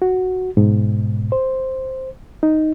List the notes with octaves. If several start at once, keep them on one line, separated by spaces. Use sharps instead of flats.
F#4
G#2 B2
C5
D#4